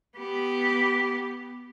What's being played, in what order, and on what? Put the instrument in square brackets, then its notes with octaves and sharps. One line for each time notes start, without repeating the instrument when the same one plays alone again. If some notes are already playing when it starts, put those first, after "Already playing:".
[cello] B3 G4